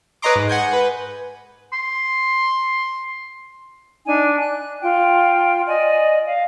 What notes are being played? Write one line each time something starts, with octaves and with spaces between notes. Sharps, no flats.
B4 C#5 D#5 A#5 C6 D6
G#2
F#5 G#5 G6
B4
C6
D4 D#4 G#5
F#6
F4 G5
D5 D#5 G#5
F5